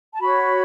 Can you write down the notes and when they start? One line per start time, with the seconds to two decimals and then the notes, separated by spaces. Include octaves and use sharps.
0.13 A5
0.20 F#4 C#5 B5